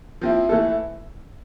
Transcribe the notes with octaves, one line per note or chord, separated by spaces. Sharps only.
F3 C4 E4
E3 A3 E4 A4